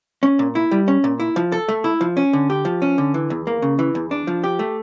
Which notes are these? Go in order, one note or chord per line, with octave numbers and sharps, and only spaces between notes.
C#4
A#2
E4
G3
C#4
A#2
E4
F3
A4
A3
E4
F3
C#4
D3
G4
F3
C#4
D3
E3
E2
A#3
C#3
E3
E2
D4
F3
G4
A3